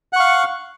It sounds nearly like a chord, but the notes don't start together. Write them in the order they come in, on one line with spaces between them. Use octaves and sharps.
F#5 C#6 F5